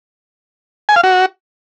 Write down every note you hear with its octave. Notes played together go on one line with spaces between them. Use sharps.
G#5
F5
F#4